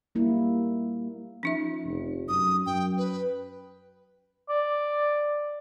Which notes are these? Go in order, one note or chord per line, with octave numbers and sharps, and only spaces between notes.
G3 A#3 E4
F3 C#4 D#4 E5
F1
F#2 D#6
F#2 G5
B4
D5